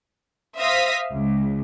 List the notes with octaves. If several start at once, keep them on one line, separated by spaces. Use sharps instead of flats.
C5 E5 F5 D#6 A#6 B6
C#2